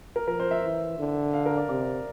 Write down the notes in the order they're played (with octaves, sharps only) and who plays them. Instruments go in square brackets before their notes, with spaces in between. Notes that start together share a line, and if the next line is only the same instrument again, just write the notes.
[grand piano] A#4
[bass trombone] F3 [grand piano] A#4
[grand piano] C5
E5
[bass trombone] E3
D3
[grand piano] F5
A#4
D5
[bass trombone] C3 [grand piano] D5